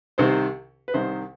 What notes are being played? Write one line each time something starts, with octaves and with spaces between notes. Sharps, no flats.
C2 C3 D#3 C5
B4
C2 C3 D#3 C5